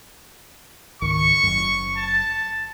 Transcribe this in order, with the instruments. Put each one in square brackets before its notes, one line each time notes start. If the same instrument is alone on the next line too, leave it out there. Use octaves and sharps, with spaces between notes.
[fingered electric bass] C#2 G#2 D#3 [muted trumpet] C#6
[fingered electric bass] F#1 F#2
[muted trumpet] A5